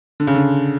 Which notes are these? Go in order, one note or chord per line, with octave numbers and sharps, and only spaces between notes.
D3
C#3
D3